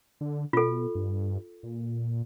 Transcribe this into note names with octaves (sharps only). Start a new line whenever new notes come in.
D3
B2 F4 A4
G2
A#2